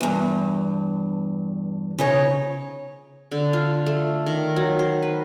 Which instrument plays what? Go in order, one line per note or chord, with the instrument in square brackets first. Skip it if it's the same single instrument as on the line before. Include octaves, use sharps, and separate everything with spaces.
[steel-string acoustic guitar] E2 G2
C#3 D#4 C#5
[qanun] D3
F4
A3
D#3
F#3
C5
B4